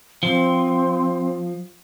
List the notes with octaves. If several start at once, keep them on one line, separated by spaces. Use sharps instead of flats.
F3 C4